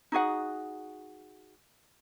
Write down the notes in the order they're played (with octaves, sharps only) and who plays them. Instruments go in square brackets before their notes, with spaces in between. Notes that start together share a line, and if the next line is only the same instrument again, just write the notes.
[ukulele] D#4 F#4 G#4 F#5